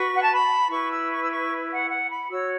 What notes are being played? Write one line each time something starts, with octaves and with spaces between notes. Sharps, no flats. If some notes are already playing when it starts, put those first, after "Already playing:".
Already playing: F#4 B4 C#6
F#5
A5
B5
E4 B4 C#6
E6
C#6
E6
C#6
F#5
F#5
B5
F#4 C#5 E6